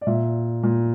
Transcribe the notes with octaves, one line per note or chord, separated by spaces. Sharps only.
D5
A#2 E5
A#2